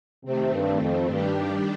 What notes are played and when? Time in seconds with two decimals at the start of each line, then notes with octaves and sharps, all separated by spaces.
0.25 C3 D#3 A3 C4
0.53 G2
0.81 F2
1.10 G2 D#3 G3 D4 G4